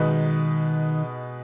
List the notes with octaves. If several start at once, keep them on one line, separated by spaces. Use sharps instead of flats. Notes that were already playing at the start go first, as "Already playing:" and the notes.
Already playing: B2 D#3 G#3 D#4 B4